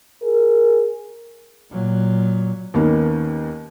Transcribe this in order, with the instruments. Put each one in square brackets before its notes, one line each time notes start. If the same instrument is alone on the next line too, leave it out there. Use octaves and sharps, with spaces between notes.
[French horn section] G#4 A#4
[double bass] A#2 F#3
[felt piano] D#2 D#3 A#3 B3 C#4